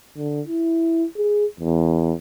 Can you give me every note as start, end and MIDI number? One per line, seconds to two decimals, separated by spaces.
0.17 0.41 50
0.47 1.05 64
1.17 1.46 68
1.60 2.13 40